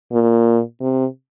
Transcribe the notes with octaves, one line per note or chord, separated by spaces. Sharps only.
A#2
C3